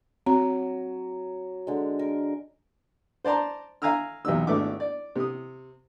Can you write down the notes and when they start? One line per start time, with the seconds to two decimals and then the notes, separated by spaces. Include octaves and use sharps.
0.26 F#3 C4 F#4 A#5
1.67 D3 G#3
1.99 A#4
3.25 C5 D5 A5 A#5 C6
3.82 E5 F5 G#5 A#5 E6 F6
4.25 B1 E2 C3 D#4 E6
4.47 G#1 A3 B3 D4 E5 D6
4.80 D5
5.16 C3 D#6